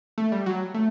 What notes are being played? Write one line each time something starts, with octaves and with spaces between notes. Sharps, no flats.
A3
G3
F#3
A3